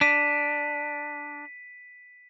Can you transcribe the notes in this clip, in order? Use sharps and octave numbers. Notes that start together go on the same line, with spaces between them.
D4 B6 D#7